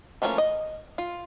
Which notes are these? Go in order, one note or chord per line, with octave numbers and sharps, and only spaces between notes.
E3 F3 A3 A#3 C#4
D#5
F4